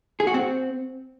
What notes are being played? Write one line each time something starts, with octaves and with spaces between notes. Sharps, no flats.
G#4
F#4
C4